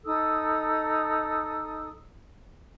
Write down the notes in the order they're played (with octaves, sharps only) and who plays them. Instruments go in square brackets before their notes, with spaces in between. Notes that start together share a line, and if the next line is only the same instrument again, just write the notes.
[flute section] D#4 A4 D#6 E6